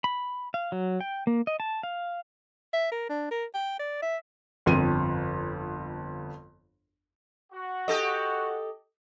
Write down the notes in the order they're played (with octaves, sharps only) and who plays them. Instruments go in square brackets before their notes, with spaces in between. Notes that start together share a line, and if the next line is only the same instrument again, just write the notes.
[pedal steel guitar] B5
F5
F#3
G5
A#3
D#5
A5
F5
[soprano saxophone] E5
A#4
D4
A#4
G5
D5
E5
[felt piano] G1 F2 D#7
[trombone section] F#4
[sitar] G4 A4 D#5